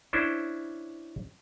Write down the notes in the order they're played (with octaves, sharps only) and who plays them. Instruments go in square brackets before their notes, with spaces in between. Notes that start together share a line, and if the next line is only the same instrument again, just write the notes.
[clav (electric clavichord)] C#4 D4 E4 C5